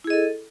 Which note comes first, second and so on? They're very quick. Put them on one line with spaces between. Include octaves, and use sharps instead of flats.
E4 G#4 D#5 A4